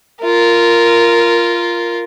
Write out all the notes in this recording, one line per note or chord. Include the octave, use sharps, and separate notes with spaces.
F4 A#4